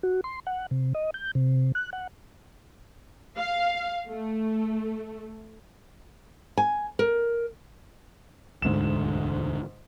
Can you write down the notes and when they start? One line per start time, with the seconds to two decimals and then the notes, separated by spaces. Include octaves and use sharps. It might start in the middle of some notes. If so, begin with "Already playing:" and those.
0.03 F#4
0.24 C6
0.47 F#5
0.71 C3
0.94 D#5
1.14 G6
1.35 C3
1.75 F#6
1.93 F#5
3.37 F5
4.09 A3
6.57 G#5
6.99 A#4
8.62 E1 D2 G#2 D3 E7